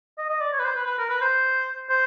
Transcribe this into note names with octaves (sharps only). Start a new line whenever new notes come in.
D#5
D#5
D5
C#5
B4
C5
B4
B4
A#4
B4
C5
C5